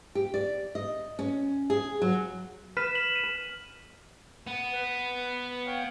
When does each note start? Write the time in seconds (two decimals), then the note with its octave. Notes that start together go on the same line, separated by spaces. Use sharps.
0.15 G4
0.34 D5
0.75 D#5
1.19 C#4
1.70 G#4
2.02 F#3
2.77 B4 F6 B6 E7
2.95 E7 F#7
3.15 D#7
4.47 B3
4.73 B4
5.66 C#5 F5 G5